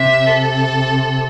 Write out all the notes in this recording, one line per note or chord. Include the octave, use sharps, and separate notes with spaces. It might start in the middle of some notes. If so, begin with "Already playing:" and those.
Already playing: C3 E5
A4